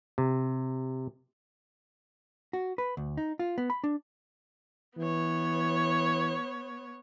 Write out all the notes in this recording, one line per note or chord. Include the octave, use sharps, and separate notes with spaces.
C3
F#4
B4
D2
D#4
F4
B3
B5
D4
E3 B3 C#5